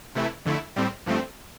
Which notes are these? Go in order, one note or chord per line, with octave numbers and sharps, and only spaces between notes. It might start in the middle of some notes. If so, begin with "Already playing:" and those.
C3 E3 A3 E4
F2 D3 A3 E4
A2 G3 C4
G2 F3 A3 C4